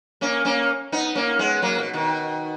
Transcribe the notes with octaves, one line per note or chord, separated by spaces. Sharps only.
A#3 C#4
A#3 C#4
B3 D#4
A#3 C#4
G#3 B3
F#3 A#3
B2
B2 D#3